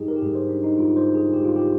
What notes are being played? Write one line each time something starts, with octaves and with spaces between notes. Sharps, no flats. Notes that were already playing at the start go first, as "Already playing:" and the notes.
Already playing: G#2 G3 D#4 G4 G#4
A#4
G4
G#2 G3 G#4
C5
D4
D#4
G#2 G3 F4
C5
G#4
G#2 G3 G4
F4
G4